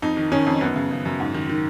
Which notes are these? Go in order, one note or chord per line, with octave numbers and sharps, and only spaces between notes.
F2 D#4
D#3
D#3 C#4
F2
F#2 B3
C#3
C#3
F#2
G#2
D#3
D#3